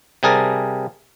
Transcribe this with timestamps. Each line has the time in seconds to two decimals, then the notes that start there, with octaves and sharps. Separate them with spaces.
0.23 C3 G3 G#4 A#4 A5